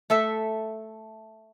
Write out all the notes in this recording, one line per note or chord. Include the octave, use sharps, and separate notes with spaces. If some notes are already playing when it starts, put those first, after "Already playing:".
A3 A4 E5